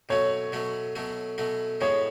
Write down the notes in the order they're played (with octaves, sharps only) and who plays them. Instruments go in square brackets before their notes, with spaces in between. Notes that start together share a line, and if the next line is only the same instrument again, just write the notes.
[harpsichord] B2 F#3 A3 C#4 [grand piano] C#5
[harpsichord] B2 F#3 A3 C#4
B2 F#3 A3 C#4
B2 F#3 A3 C#4
[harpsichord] A2 E3 G#3 B3 [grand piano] C#5